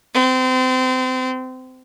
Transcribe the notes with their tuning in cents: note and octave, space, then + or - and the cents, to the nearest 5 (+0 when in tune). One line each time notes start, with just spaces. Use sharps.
C4 -30